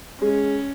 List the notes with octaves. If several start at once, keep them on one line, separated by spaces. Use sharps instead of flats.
G#3 C#4